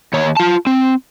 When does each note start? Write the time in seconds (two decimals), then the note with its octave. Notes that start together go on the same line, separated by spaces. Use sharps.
0.13 D#2 C#5
0.37 F4 A5
0.67 C4